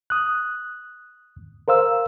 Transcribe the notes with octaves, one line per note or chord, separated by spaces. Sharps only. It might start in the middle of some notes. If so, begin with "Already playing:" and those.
D#6 F#6
A#4 C5 F5 E6